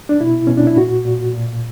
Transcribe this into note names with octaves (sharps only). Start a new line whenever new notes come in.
D4
B2 E4
B2 C#4
D4
E4
A#2 F#4
A#2
A#2